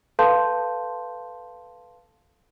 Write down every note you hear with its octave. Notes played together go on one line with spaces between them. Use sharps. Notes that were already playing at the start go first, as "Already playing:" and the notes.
A4 B4 F5 A5 C6 G6